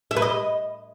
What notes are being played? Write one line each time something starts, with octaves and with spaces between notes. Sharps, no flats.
E5
B4
D#5